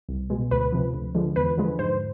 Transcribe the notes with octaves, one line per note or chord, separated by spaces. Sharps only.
C2
B2 G#3
D2 B4
C3 F3
D2
D3 F3 G#3
E2 B4
D3 F3 G#3
G#2 C5